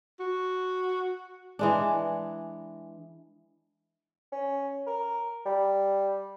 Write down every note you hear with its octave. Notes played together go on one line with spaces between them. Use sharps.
F#4
E3 G#3 D4
C#4
A#4
G3